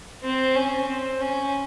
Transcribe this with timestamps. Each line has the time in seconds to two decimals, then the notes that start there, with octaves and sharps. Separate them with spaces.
0.23 C4
0.55 C#4
0.88 C4
1.21 C#4